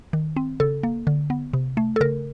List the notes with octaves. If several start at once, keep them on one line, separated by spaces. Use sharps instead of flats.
D#3
C4
C#3 A4
A#3
D3
B3
C3
A3
A4
C#3 A#4